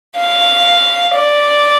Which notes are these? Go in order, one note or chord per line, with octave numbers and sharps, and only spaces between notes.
F5
D5